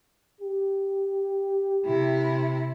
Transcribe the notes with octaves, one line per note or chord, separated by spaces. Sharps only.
G4
C3 E4